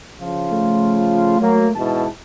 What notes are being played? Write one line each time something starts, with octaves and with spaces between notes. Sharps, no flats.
C#3 F3 F4
A3
F#3 A#3
G#2 B2 E3 A5